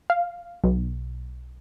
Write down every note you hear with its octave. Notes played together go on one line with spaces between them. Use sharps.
F5
B1